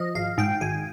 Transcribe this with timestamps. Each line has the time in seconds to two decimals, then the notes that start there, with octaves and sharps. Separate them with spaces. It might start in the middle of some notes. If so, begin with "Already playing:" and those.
Already playing: F3 D#5
0.15 G#1 F5
0.38 G#2 G5
0.61 G#1 G#5